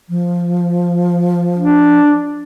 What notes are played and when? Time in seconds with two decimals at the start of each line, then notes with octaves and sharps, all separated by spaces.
0.10 F3
1.58 D4